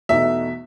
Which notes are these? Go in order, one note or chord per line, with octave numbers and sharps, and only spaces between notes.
E2 B2 A3 D#4 F#4 E5